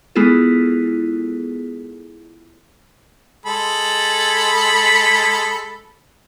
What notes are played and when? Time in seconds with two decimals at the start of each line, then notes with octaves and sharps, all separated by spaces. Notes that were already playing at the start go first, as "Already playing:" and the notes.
0.16 G#3 B3 E4 F4 G#4 A4
3.46 G#3 A4 B5